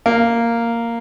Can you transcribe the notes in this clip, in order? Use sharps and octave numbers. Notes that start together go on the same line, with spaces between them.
A#3